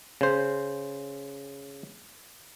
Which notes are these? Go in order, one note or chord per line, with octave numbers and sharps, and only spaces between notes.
C#3 C5